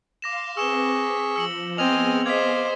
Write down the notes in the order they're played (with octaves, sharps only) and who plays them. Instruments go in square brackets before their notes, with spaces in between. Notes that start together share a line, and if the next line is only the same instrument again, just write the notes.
[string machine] F5 C6 [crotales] D6 A#6 E7
[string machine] C4 B4 [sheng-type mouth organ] G#4 C#6 [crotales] E6 E7 G7
[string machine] B6
[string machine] F3 [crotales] E6 C#7 F#7
[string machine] B3 G#4 [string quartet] C4 [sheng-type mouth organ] D#5 G#5 F6 [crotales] F7
[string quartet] C5 D#5 [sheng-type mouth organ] F5 D6 [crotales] G#6 B6